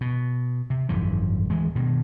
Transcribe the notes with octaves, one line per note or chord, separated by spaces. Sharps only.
B2
C3
G#1 F#2 E3 F3
D1 E3 G#3
G2 B2 D#3